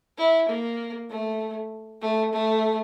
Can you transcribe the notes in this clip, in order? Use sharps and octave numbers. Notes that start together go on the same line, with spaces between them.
E4
A#3
A3
A3
A3